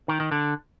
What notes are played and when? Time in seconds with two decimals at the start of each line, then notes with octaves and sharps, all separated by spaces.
0.08 D#3
0.20 D#3
0.32 D3